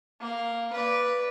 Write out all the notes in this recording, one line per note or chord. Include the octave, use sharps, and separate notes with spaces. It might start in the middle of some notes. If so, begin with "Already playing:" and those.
A#3 F5
B4 D5